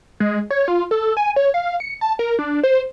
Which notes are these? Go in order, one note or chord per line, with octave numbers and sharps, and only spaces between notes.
G#3
C#5
F4
A4
G#5
C#5
F5
C#7
A5
A#4
D4
C5